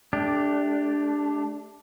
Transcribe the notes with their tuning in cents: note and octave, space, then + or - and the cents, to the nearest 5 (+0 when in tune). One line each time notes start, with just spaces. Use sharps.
A3 -25 D4 -5 G4 +10